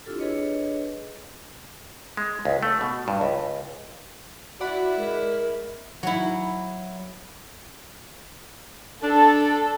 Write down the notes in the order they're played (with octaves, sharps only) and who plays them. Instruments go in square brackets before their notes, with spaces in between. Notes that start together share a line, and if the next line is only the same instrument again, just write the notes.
[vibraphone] C4 D4 E4 F4 G4 A4
D4 G#4 A4 B4 C#5 D#5
[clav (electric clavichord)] G#3
C#2
A3
B2
G2
C#2
[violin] E4 [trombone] F#4 [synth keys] D5 F#5 B5
[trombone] G#3 [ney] A#4
[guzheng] F#3 E4
[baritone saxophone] D4 [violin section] A4